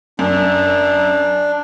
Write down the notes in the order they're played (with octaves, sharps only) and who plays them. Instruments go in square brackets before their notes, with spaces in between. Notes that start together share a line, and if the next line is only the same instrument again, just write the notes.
[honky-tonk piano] F#2 [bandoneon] D4